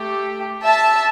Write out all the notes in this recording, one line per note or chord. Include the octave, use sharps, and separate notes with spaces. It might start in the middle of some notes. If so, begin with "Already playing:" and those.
Already playing: A3 G4
E5 A5